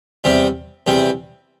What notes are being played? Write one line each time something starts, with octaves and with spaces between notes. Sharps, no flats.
E2 C3 G3 C4
E2 C3 G3 C4